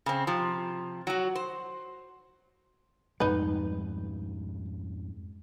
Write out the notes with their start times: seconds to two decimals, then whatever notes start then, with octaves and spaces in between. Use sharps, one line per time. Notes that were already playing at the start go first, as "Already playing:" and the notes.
0.06 C#3 C4
0.27 C3 F3
1.07 F#3 F#4
1.35 C5
3.20 F2 G#2 G3 D#4 B4